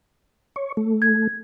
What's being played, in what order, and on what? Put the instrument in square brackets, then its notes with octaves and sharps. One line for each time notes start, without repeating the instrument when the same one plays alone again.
[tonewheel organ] C#5
A3
[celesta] G#6